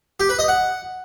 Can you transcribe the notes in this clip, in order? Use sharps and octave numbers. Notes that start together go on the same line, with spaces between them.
G4
B4
D#5
F#5